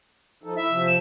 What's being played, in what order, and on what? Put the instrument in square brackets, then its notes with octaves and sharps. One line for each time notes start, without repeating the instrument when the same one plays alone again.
[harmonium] F3 D#4 A4
[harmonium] E4 [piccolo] E5
[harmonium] C3 F3
[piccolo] E7